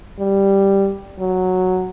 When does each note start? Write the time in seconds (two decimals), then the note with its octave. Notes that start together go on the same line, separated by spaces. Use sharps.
0.20 G3
1.19 F#3